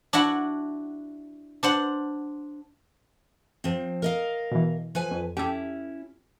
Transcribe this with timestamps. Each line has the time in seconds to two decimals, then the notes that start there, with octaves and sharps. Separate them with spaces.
0.13 D4 E4 F#4 F#5
1.63 D4 C5 F#5
3.64 F3 C4
4.02 A#4 D#5 F5
4.52 B2 E3
4.95 F3 B4 G#5
5.11 F2
5.37 C#4 E4 G4 A4